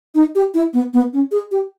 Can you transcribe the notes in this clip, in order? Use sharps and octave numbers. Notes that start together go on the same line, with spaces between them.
D#4
G4
E4
B3
B3
C#4
G#4
G4